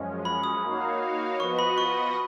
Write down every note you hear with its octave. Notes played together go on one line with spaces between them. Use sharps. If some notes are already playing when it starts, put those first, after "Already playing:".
Already playing: F#2 F3 G#3 C#4
B5
D#6
A#3 D#4 F#4 C#5 F5
F3 B3 F#4 B4 D#5 C#6
B5
C#6